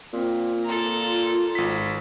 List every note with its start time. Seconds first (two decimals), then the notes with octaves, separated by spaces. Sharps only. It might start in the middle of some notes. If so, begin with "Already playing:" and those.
0.14 A#2 C4
0.64 F4 A4 A#5
1.55 G#1 B6